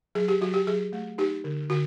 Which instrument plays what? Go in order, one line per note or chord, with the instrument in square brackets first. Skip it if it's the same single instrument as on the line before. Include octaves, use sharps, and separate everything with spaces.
[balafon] F#3 G#4
G4
F#3 F#4
G4
F#3 G#4
A3
D#4 G4
D3
D3 F#4